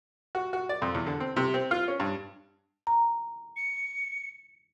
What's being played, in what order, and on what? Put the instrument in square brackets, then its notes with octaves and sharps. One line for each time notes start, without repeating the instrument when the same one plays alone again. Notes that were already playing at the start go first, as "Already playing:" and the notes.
[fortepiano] F#4
F#4
D5
F2
E2
D3
C4
C3
C4
F4
C#4
G2
[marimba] A#5
[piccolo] C#7